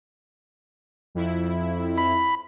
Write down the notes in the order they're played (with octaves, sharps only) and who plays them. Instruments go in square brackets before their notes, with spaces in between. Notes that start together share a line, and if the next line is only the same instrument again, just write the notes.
[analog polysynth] F2 E4
[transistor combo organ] B5